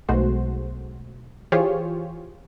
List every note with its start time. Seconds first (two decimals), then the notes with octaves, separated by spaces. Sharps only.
0.09 B1 B2 G#3 A3 F#4 C5
1.52 E3 F4 G4 G#4 C5 C#5